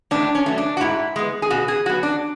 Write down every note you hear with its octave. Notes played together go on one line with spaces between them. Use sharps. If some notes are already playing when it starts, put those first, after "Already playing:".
A2 D4
C#4
F#3 A3
D4
F#4
G#2 E4
G#3 B3
G#4
B2 F#4
G#4
F#3 B3 F#4
D4